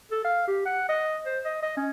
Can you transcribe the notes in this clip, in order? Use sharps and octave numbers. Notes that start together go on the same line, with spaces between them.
A4
F5
G4
F#5
D#5
C5
D#5
D#5
C#4